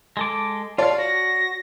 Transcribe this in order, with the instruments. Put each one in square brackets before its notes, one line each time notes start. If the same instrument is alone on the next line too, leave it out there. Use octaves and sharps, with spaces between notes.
[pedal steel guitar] G#3 A4 D6
[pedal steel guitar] F4 F5 [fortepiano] C#5 D5 A5
[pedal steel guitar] F#4 [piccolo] A#6